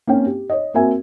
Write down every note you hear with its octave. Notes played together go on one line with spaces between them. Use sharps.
A#3 C4 C#4 G5
G4
C#5 D#5
A#3 C4 F#4 A#4 E5 G#5